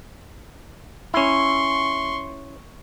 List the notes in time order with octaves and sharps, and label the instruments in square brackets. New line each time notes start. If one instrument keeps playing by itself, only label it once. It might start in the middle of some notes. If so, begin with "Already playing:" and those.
[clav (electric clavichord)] C#4 E4 [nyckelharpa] C6 C#6